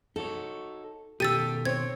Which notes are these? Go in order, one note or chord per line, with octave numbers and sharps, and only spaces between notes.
D#4 F#4 A4 C#5
B2 D#3 G4 A4 E6 A6 D#7
C4 C#5 G#6